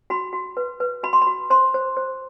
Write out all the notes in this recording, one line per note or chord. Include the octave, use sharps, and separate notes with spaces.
F#4 B5
F#4
B4
B4
F#4 B5
C6
B5
F#4
C5 C6
C5
C5